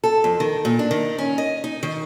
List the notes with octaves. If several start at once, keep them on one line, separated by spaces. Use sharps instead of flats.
A4
F2
D#3
A#2
D4
D#3
C#4
D#5
D#4
D#3